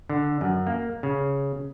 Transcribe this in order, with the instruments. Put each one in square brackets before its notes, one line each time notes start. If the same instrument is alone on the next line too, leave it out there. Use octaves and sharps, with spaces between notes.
[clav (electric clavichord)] D3
F#2
A#3
C#3